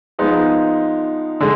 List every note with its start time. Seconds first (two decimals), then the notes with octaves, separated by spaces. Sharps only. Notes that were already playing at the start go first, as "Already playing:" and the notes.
0.19 F3 G#3 B3 D#4
1.40 D3 G#3